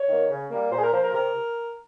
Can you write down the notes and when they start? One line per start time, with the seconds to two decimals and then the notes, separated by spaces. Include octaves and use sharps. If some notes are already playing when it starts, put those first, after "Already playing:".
Already playing: C#5
0.08 D#3 A#3
0.29 C#3
0.50 G3 A#3
0.71 A#2 C5
0.77 G#4
0.83 A#4
0.92 F3 A#3 F4 C5
1.03 A#4
1.13 C3 A#4